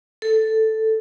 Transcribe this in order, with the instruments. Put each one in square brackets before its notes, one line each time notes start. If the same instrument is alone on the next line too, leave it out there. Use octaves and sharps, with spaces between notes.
[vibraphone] A4